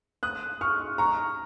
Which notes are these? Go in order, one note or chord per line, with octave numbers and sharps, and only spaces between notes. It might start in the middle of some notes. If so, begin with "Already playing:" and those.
D#6 F#6
C#6 F6
A#5 C#6